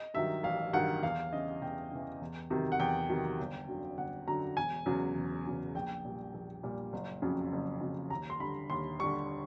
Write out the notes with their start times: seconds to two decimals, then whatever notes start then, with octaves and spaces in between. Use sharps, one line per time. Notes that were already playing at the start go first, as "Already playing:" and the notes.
Already playing: D#5
0.14 G2 D#3 F#3 E5
0.44 A1 F5
0.73 G2 D#3 F#3 F#5
1.03 E2 F5
1.32 C#3 E3 D#5
1.61 E2 G5
1.92 C#3 E3
2.21 E2
2.50 C3 D#3 F#3
2.72 F#5
2.80 E2 G5
3.09 C3 D#3 F#3
3.40 G1
3.68 F#2 D3 F#3
3.98 G1 F#5
4.27 F#2 D3 F#3 A#5
4.57 E1 G#5
4.86 E2 C#3 F#3
5.16 E1
5.46 E2 C#3 F#3
5.75 A#1 G5
6.05 A#2 G3
6.34 A#1
6.63 A#2 G3
6.93 F#1
7.22 F2 C#3 F#3
7.52 F#1
7.81 F2 C#3 F#3
8.10 D#2 A#5
8.30 C6
8.40 D3 G3 B5
8.70 D#2 C6
8.99 D3 G3 C#6